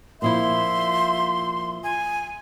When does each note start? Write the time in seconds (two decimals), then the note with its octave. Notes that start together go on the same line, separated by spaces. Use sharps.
0.22 A#2 F3 E4 E5 C6
1.84 G#5